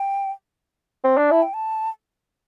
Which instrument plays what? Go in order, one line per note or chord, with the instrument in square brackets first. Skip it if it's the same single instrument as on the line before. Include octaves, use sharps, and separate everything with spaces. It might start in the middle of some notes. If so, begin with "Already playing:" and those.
Already playing: [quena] G5
[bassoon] C4
D4
[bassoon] E4 [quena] A5
[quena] G5
A5